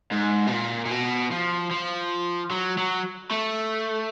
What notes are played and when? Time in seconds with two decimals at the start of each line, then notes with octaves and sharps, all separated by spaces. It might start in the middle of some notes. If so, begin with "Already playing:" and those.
0.12 G#2
0.47 B2
0.52 A#2
0.86 A#2
0.91 B2
1.32 F3
1.71 F3
2.51 F#3
2.78 F#3
3.31 A3